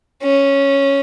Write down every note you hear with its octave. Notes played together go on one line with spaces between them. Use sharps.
C#4